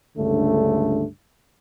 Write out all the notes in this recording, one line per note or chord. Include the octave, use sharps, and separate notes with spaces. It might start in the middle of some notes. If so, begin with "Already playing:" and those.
C#2 G2 D3 A3